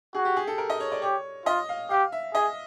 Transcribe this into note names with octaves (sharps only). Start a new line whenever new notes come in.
F#4 G#4
G4
G#4
A4
A#4
D#5
C#5
D5
G4 C#5
F4 D#5
F5
G4 F5
E5
G#4 D#5